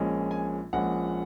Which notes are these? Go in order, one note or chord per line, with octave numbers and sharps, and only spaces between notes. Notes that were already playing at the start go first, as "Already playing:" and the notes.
Already playing: A#1 A#2 G#3 C#4
G#5
A#1 A#2 G#3 C#4 F#5